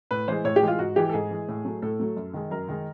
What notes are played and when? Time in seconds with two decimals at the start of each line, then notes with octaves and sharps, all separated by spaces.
0.11 A2 B4
0.28 E3 G#3 C5
0.44 A2 C#5
0.56 G4
0.63 E3 G#3 F4
0.79 G#2 F#4
0.96 E3 G#3 G4
1.09 A4
1.13 G#2 G#4
1.31 E3 G#3
1.48 A2
1.65 F#3 A3
1.82 A2 A4
2.00 F#3 A3
2.17 F#2
2.33 D#3 G#3
2.51 F#2 A#4
2.68 D#3 G#3